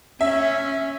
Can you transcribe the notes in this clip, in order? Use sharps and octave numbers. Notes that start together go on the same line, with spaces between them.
C#4 E5